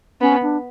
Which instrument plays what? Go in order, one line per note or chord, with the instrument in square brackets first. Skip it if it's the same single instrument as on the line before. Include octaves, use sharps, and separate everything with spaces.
[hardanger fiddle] B3 [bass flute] C#4
[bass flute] D4